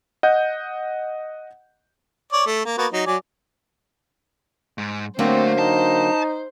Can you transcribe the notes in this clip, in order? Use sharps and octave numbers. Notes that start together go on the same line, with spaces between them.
D#5 F#5 G6
C#5 D5
A3
A#3
A#3 B3 F#4
F#3 D#4
F#3 D5 G#5
G#2
D3 F#3 A3 A#3 C4 C5
D#4 A5